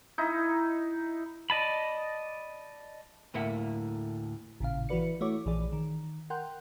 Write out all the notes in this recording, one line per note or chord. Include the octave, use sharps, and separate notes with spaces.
D#4 E4
D5 D#5 A5 B5
D2 A2 A#3 E5 F#5
A1 A#2 C#3 F5
E3 E4 F#4 B4 D5 C#7
A3 E4 F#4 C#5 D6
A#1 E3 G#4 D5
D#3
A#4 F#5 G5 C6 F#6 G6